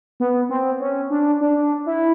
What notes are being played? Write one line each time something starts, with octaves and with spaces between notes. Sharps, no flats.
B3
C4
C#4
D4
D4
E4